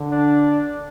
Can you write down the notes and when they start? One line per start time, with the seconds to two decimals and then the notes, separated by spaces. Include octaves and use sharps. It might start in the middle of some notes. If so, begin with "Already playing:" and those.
Already playing: D3
0.11 D4